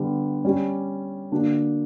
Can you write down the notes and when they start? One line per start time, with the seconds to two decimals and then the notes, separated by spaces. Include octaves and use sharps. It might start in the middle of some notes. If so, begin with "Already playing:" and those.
Already playing: D3 G3 B3
0.45 G3 C#4 G4
1.32 D3 A#3 D4 F#4